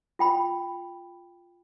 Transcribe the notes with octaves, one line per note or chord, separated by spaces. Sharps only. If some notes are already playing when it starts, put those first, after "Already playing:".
F4 G5 B5